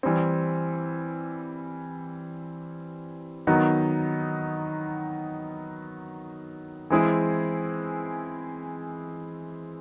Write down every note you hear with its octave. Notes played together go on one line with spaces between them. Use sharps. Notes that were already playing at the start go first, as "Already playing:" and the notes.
E3 G3 C4
D#3 F#3 B3 D#4
E3 G#3 C4 E4 G#4